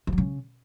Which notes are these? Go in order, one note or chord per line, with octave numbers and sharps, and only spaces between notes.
E3
F#3
C#3